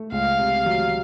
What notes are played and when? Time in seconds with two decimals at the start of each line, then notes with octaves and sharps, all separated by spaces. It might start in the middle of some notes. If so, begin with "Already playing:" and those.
Already playing: A3
0.12 C#2 F5
0.39 C3
0.66 F#3